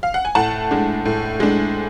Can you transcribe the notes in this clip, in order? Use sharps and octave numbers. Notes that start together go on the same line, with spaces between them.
F5
F#5
G#5
A2 F#5 A5
G#3 D4
A2
G#3 D4